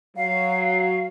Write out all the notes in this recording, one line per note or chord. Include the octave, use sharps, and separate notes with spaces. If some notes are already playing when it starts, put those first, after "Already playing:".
F#3 F5